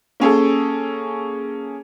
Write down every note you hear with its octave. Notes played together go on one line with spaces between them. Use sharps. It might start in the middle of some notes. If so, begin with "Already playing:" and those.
A#3 C#4 G#4 A4